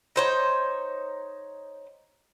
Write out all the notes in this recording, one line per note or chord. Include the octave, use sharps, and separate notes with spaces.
D#4 C5 C#5